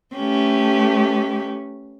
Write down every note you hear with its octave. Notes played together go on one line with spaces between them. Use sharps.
A3 C#4 G4 B4